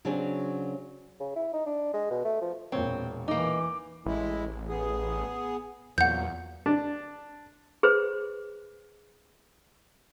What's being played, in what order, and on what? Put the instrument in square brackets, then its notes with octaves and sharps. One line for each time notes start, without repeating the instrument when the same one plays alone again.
[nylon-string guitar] C#3 F#3 C4 D4 F#4 G#4
[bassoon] C#3
E4
D#4
D4
G#3
B2
A3
F3
[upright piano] E1 A#2 C#5 [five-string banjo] C4
[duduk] E3 [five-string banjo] A#3 D#4 [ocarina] D6
[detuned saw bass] A1 [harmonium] G#3 E4
[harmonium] B3 G#4
[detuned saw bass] E2 [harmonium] A#2 F#3 A#3 [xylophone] F#5 G6
[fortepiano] D4
[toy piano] G#4 B4 C5